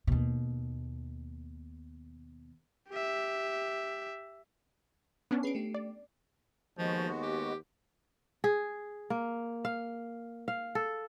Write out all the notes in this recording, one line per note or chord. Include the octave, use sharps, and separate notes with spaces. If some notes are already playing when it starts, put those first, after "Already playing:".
D#2 B2
G4 E5
B3 C#4 D4
C#4 G#4 B4 C7 D7
A3 G4
D5
D#2 F3 G#3 B3 F#4
G4
G#4
A#3
F5
F5
A4